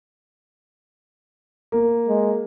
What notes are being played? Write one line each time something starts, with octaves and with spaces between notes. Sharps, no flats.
A#3
G#3